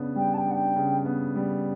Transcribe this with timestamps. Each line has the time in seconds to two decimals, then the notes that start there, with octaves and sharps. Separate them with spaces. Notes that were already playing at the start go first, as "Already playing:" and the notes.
Already playing: C#3 B3 D4
0.16 G3 G5
0.33 A5
0.37 G5
0.46 D4 F#5
0.54 G5
0.76 C#3
1.05 B3
1.35 G3